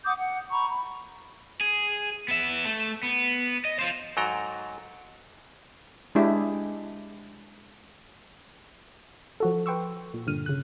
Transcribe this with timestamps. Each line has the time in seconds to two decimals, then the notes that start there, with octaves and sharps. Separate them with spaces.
0.04 F#5 D6 D#6 G6
0.16 F#5
0.50 A#5 B5 C#6
0.68 B5
1.61 G#4
2.28 B3 E5
2.65 A3
3.03 B3
3.65 D#5
3.79 F4 C5
4.17 G#2 F#3 A4 G5 A#5
6.15 G#3 D4 E4 G4
9.40 F3 F#4 A4
9.66 B4 G5 C6 C#6 E6
10.14 A#2
10.27 G2 A#2 D3 F6 D#7
10.46 C#3 F#6